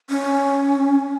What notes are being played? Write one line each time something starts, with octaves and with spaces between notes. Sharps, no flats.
C#4